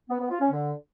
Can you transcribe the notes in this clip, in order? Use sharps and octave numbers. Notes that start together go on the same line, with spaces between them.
B3
B3
F4
C#4
D3